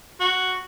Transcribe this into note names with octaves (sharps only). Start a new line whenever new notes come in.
F#4